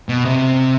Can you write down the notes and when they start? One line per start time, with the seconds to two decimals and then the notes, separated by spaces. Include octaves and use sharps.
0.09 B2
0.25 C3